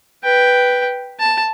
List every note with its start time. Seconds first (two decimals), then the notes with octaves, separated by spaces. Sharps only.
0.24 B4 G5
1.19 A5